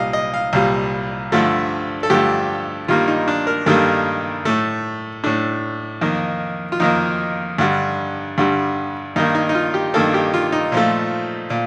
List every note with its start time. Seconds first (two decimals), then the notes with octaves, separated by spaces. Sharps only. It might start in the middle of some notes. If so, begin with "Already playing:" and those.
Already playing: C2 A#2 G3 D#5 F5
0.13 D#5
0.34 F5
0.53 C2 A#2 G3 F5
1.32 G2 D3 F3 A3
2.03 A4
2.10 G2 D3 F3 A3 G4
2.88 G2 D#3 G3 A#3 F4
3.08 D#4
3.28 D4
3.47 A#4
3.66 G2 D#3 G3 A#3 A4
4.45 A2 A3
5.24 A2 A3 D4
6.01 F2 D#3 A#3
6.72 F4
6.80 F2 D#3 A#3 D#4
7.58 G2 D3 G3
8.38 G2 D3 G3
9.16 G2 D#3 A#3 D#4
9.35 D#4
9.49 D#4
9.55 F4
9.74 G4
9.94 G2 D#3 A#3 A4
10.14 G4
10.34 F4
10.52 D#4
10.72 A#2 F3 A3
11.50 A#2